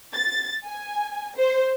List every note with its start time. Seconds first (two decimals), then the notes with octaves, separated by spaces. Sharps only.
0.13 A6
0.65 G#5
1.36 C5